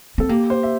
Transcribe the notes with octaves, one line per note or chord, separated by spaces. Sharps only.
C4 A4
A#3 G4
C5
E5